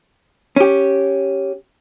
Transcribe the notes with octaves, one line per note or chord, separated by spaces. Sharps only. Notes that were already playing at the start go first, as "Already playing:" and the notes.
C#4 G4